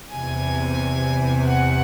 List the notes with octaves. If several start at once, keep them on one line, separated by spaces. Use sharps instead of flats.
E2 C3 E3 G#5
F#5